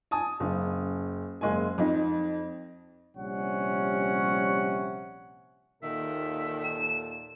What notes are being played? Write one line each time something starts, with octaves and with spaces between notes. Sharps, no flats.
G#5 A5 D#6
F#1 C#3
F#1 G#3 A#3 G#5
F2 D#4
A#1 C3 G3 C#4 C#5 F#5
D#2 A#2 D#3 A4 E5
E7